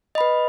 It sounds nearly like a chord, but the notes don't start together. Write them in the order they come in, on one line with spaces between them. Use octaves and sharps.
D#5 B5 B4